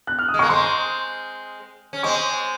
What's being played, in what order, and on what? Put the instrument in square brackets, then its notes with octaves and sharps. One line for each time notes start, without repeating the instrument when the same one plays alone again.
[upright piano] F#6
F6
D#6
[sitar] G#3
[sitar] A#3 [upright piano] C#6
[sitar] G#3 C4 [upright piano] C6
[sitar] C#4
[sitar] G#3 C4 [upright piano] C#6